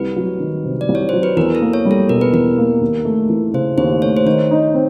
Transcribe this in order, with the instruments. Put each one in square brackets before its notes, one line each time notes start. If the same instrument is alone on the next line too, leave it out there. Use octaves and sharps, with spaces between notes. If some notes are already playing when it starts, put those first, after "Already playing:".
Already playing: [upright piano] C2 [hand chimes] B4
[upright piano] F#3
D#3
C3
[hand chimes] D5
[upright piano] C2
[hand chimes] C#5
[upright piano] F#3 [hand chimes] C5
[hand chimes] B4
[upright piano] E2 [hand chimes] A#4
[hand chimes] A4
[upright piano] A#3
[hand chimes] C#5
[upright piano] G3
[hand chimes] A4
[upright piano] B2 [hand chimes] A#4
[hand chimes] B4
[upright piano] E2 [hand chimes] A#4
[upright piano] A#3
D#2
A3
E3
[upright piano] C#3 [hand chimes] C5
[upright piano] D#2 [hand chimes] C5
[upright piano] A3 [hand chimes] C#5
[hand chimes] C5
[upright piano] D#3 [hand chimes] C#5
[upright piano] D#4
C4